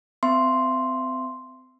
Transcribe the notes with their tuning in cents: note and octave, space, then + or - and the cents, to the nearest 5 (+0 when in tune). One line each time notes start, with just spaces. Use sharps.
C4 -30 E5 +30 C6 +0